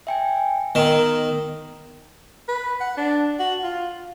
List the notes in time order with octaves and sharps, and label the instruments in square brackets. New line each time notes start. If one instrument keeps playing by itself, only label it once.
[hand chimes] E5 G5 G#5
[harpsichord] D#3 [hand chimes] B3 A#4 A#5
[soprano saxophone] B4
F#5
D4
F#4
F4